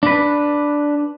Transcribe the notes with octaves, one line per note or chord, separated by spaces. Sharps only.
D4 B4